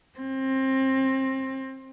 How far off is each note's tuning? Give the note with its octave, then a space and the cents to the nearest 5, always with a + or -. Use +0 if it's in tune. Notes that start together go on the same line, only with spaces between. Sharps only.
C4 +25